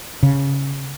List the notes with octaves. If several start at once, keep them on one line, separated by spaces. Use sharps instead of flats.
C#3